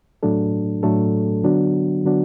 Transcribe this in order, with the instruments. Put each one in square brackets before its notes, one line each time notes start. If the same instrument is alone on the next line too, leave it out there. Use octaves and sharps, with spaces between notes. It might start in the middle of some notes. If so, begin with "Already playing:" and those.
[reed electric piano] A2 F#3 A3 D4 A4
A2 F#3 A3 D4 A4
D3 F#3 B3 D4 F#4
D3 F#3 B3 D4 F#4